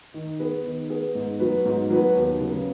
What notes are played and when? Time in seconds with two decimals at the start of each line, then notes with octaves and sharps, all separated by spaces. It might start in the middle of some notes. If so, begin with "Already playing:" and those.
0.14 D#3
0.39 B3 G#4 B4
0.65 D#3
0.90 B3 G#4 B4
1.15 G#2
1.39 F#3 B3 F#4 B4
1.66 G#2
1.90 F#3 B3 F#4 B4
2.15 D#2
2.41 C#3 F#3 B3